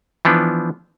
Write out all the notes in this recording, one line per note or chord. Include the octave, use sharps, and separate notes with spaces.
E3 F3 B3 D4